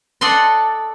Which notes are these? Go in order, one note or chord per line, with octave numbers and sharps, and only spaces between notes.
A4 D5 D#5 F#5 C6